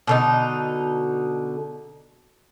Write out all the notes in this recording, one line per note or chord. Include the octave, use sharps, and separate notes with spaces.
B2 D3 D#4